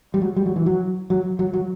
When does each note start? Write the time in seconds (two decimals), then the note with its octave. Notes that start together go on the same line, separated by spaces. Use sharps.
0.14 G3
0.22 F#3
0.36 G3
0.46 F#3
0.56 E3
0.66 F#3
1.10 F#3
1.39 F#3
1.54 F#3